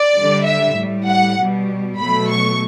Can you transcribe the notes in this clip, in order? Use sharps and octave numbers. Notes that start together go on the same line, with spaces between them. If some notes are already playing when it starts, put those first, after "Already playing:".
Already playing: D5
D3 G3
E5
A2 G3
F#5
B2 G3
B2 F#3 A3 B5
C#6